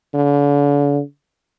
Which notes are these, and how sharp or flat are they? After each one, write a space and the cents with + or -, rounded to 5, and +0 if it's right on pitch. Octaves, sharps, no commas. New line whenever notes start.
D3 -40